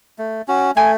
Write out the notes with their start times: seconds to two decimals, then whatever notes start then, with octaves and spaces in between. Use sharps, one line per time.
0.18 A3
0.48 C#4 F#4
0.76 A3 G#5